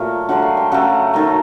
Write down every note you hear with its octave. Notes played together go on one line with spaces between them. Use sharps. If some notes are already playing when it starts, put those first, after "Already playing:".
Already playing: A#2 F#3 A3
D3 F#3 A3 F#5
F5
G5
C#3 F#3 A3 F#5
D#3 F#3 A3